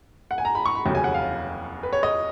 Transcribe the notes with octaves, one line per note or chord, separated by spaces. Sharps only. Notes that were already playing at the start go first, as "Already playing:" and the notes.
F#5
G#5
A#5
B5
C#6
B5
F1 D#2 C#3 F#3
G#5
F#5
F5
B4
C#5
D#5